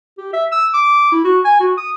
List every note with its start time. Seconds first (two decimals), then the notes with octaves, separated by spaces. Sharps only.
0.18 G4
0.33 E5
0.52 E6
0.74 D6
1.12 E4
1.24 F#4
1.45 G#5
1.60 F#4
1.77 D#6